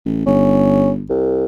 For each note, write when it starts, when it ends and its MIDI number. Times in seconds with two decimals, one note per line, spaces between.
0.05 0.23 33
0.26 1.07 31
0.26 0.90 61
1.10 1.46 36